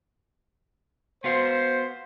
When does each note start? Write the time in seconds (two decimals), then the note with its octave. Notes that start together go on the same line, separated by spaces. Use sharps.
1.24 B3 F#4 C5 F5